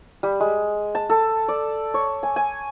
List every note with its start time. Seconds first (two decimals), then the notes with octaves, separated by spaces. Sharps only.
0.23 G3
0.40 G#3
0.95 A5
1.10 A4
1.48 D5
1.94 C#5
2.23 G#5
2.36 G#5